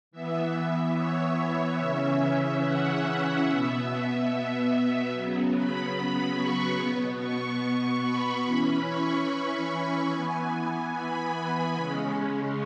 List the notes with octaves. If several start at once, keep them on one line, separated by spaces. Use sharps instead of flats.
E3 B3 E5
C#5
C#3 E3 C#4 E5
F#5
B2 B3 E5
C#3 F#3 B3
B5
C#6
B2 B3
C#6
B5
E3 C#4 B5
C#6
B5
E3 B3 G#5
B5
B5
C#3 G#3 C#4